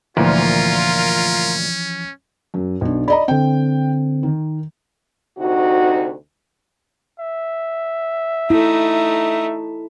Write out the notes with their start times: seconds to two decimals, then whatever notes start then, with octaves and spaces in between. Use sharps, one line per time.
0.17 D2 A#2 E3 F3 C#4 F4 A#4
2.54 F#2
2.81 B1 D4
3.08 D5 D#5 A#5 B5
3.28 D3 C4 G5
4.23 D#3
5.38 D2 C3 D#4 F#4
7.19 E5
8.50 A3 D#4 E4